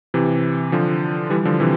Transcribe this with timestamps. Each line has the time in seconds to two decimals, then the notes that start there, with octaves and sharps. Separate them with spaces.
0.14 C3 E3
0.72 D3 F3
1.30 E3 G3
1.45 D3 F3
1.60 C3 E3